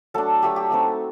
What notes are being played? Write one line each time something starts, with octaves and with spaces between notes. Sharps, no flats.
F#3 A3 D4 A4
F#3 A3 D4 G4
G4
A3 C4 D#4 F#4